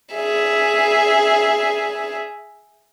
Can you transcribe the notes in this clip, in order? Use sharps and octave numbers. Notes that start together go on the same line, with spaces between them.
G#4 E5